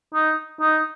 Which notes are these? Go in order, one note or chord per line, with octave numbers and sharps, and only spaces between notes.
D#4
D#4